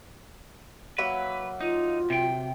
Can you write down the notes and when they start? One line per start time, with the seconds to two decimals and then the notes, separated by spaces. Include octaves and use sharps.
0.98 F#3 A#3 B4 E5
1.61 D#4 F4
2.10 C3 G5